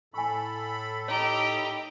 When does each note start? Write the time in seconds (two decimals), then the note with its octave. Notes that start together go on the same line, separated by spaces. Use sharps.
0.14 A2 A4 G#5 B5 C#6
1.08 D#4 G4 C#5 A#5